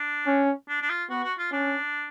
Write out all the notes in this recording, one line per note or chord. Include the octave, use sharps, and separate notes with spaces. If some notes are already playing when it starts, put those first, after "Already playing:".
Already playing: D4
C#4
D4
D4
F4
B3 F#4
F#4
F4
C#4 D4